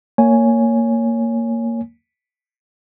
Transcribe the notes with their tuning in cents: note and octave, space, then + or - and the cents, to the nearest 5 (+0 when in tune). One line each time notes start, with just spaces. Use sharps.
A#3 -15 C#5 +10 G#5 +0